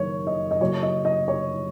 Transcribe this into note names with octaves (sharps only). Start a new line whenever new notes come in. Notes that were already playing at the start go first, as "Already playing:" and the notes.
Already playing: F#1 F#2 D#3 C#5
D#5
D#5
F#1 F#2 F#3 C#5
D#5
D#5
C#5